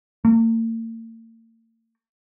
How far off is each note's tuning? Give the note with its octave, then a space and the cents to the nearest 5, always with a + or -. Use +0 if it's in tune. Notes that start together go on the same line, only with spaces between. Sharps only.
A#3 -45